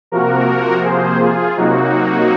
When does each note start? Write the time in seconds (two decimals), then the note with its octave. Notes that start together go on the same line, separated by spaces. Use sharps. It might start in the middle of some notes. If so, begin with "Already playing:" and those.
0.12 C3 F3 A#3 F#4 A#4
0.84 G#4 C5
1.20 F4 G#4
1.57 C3 F#3 A#3 D#4 F#4